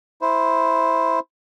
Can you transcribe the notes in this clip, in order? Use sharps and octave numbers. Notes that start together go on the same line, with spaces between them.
E4 C5